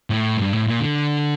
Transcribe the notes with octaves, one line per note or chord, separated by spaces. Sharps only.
A2
G2
A2
A#2
D3